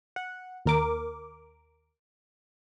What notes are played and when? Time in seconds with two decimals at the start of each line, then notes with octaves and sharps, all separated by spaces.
0.16 F#5
0.65 D#2 A#4 D6